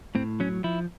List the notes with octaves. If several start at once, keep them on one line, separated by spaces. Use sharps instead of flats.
A2 C4
F#3 C#4
F3 E4